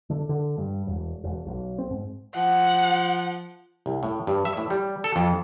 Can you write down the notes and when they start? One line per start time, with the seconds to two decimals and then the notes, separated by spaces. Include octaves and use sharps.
0.10 D3
0.29 D3
0.58 G2
0.87 E1
1.24 E1
1.46 B1
1.78 C4
1.91 G#2
2.35 F3 F#5
3.86 C2
4.03 A2
4.27 G2
4.45 E5
4.57 A2
4.70 G3
5.04 A4
5.16 F2